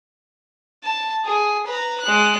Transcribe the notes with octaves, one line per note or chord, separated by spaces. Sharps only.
A5
G#4
B4 A#5
G#3 F#6